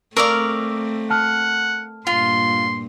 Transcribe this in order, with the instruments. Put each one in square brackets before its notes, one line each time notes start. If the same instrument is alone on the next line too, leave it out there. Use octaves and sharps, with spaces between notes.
[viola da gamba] A3 C4 [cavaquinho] A#4 D5 F5 [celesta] C#6 D#6 E6
[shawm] F#5 [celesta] A5 F6
[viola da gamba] G2 A#2 [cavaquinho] F4 [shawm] C6